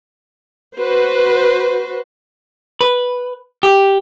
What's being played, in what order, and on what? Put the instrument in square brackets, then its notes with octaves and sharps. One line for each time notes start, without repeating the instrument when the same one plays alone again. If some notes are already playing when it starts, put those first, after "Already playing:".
[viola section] F#4 B4 C5
[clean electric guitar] B4
G4